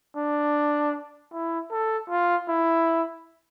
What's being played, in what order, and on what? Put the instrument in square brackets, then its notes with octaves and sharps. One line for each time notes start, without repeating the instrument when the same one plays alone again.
[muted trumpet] D4
E4
A4
F4
E4